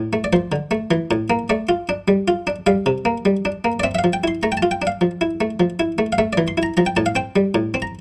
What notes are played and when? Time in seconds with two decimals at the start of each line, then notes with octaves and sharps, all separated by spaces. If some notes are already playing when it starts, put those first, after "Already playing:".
Already playing: A2
0.13 A3
0.24 D5
0.33 F3 C5
0.52 D3
0.71 A3
0.91 E3
1.11 A2
1.30 A#3
1.50 A3 D5
1.69 F4
1.89 D4
2.08 G3
2.28 F4
2.47 D4
2.67 G3 F5
2.86 C3
3.05 A#3
3.25 G3
3.45 D4
3.65 A#3
3.80 D5
3.84 C4 E5
3.95 E5
3.99 F5
4.04 F3
4.13 G5
4.24 E4 C6
4.43 A3 A#5
4.52 G5
4.57 A5
4.62 F4
4.71 G5
4.82 D4
4.87 F5
5.01 F3
5.21 E4
5.41 A3
5.60 F3
5.80 E4
5.98 A3
6.13 F5
6.18 A3 E5
6.33 E3 D5
6.48 C6
6.58 E4
6.63 A#5
6.77 F3 A#5
6.86 G5
6.96 A2 A5
7.06 F5
7.15 C4 G5
7.36 G3
7.55 A2
7.74 C4
7.82 A#5